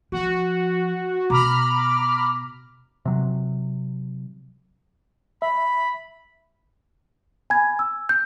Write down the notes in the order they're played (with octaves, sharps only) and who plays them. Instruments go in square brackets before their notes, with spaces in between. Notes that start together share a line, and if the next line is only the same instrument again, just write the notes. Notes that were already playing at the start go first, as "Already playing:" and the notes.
[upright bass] F3 [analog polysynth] F#4
[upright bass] B2 [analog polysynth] A#5 B5 F6 [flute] D6
[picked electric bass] C3 F#3
[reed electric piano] E5 [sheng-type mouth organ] B5
[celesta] G#5 B5 G#6
E6
G6